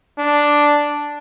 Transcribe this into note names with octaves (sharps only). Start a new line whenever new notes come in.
D4